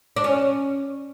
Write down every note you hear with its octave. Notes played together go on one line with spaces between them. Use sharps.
D4
C#4